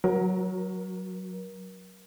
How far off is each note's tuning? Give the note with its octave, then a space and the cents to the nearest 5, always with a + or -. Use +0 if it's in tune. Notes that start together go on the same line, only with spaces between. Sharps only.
F#3 +0 A#4 +30